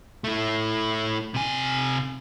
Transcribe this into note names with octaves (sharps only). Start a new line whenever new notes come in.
A3 E4
C3 G#5